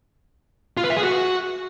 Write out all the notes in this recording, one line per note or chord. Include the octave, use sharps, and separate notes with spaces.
F4
B4
E5
G#4
F#4